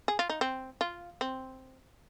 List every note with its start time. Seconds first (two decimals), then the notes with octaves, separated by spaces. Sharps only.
0.08 G#4
0.19 F4
0.30 D#4
0.41 C4
0.81 F4
1.21 C4